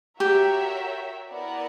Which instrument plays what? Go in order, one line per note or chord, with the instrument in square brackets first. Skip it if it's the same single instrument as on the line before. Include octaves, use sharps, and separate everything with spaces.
[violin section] F#4 A#4 C#5 E5 G5 [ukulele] G4
[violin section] B3 E4 A#4 D5 F#5